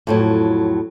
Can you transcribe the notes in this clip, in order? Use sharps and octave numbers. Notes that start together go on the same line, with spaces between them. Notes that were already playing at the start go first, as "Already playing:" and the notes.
F2 A2 F#3